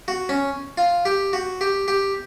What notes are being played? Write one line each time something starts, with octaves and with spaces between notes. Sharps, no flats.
F#4
C#4
F4
G4
F#4
G4
G4